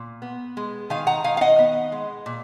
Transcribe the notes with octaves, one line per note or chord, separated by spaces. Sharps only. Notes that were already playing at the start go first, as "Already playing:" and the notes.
Already playing: A#2
B3
G#3
D#3 F5 G#5
F#5 A#5
D#3 F5 G#5
F5
D#5 F#5
B3
G#3
A#2